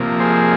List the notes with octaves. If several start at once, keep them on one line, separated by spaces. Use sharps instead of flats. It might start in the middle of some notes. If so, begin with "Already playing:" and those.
Already playing: C3 F3 A#3
G#4 C5